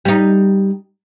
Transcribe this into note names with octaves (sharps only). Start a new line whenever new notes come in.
G3 D#4